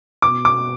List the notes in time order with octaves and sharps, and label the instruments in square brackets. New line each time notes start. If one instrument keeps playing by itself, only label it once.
[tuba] B2 [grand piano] D6
[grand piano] D6